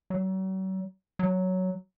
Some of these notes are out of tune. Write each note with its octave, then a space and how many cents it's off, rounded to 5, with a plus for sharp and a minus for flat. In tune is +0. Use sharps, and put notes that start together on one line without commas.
F#3 +40
F#3 +5